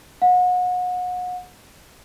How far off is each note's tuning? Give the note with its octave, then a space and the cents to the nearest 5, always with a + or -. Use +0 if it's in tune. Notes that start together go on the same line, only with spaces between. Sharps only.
F#5 -35